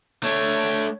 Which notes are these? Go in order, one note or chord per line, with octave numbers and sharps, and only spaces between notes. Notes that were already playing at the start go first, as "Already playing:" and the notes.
A3 D4 C#5